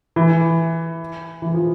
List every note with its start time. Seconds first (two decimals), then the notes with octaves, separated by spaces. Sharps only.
0.16 E3
1.42 E3
1.54 F3